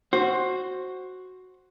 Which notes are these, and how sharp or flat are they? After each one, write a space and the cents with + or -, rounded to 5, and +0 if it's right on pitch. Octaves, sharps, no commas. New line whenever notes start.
F#4 +0 C5 +15